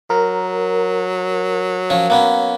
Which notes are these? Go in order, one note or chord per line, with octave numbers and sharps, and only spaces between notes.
F#3 A#4
F3 C#4
A#3 B3 C#4